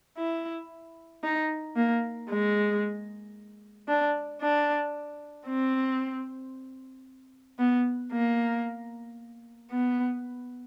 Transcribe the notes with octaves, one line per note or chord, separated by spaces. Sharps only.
E4
D#4
A#3
G#3
D4
D4
C4
B3
A#3
B3